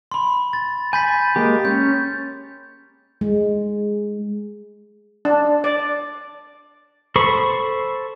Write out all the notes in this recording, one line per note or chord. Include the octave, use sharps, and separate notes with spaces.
B5 C6
A6
G#5 B5 G6 A6 B6
G#3 A#3 G4
C#4 G6
G#3
D4
D5
A4 C5 B5 C#6